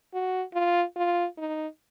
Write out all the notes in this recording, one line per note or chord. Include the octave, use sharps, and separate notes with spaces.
F#4
F4
F4
D#4